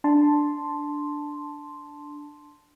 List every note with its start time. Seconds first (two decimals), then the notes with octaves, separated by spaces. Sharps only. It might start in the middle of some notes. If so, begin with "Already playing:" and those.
0.04 D4 A5 C6